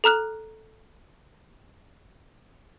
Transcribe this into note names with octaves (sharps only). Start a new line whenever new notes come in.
A4 A#5 F6 F#6